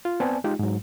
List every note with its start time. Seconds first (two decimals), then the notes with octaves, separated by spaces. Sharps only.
0.05 F4
0.20 B3 C4 D5 G#5 A5
0.44 G#3 D#4 F4 G4
0.59 G#2 F#3